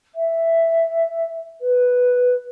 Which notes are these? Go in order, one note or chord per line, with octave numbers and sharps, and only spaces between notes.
E5
B4